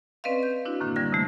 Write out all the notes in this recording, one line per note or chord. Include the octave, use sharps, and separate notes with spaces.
C4 C#4 B4 D5 D#5 F5
G6
D4 E4 F#4
F#2 A2 D3 D#3 A#3 D4
D3 G3 G#6 A#6
C3 E3 A3